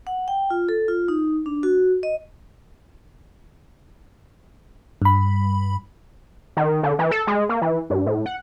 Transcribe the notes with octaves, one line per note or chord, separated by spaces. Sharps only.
F#5
G5
F4
A4
F4
D#4
D4
F#4
D#5
G2 B5
D#3
D3
E3
A4
G#3
A#3
E3
G2
A2
F#5